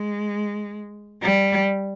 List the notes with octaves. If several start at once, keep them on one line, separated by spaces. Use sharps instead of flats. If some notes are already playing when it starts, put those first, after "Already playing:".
Already playing: G#3
G3